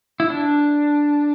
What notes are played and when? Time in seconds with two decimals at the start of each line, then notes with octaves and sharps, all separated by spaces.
0.20 E4
0.30 D4